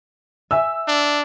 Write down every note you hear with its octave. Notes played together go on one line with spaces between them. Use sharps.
E5 G#5 E6
D4